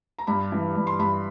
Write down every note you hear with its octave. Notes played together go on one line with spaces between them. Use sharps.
A#5
G2 B5
E3
G2
C6
G2 B5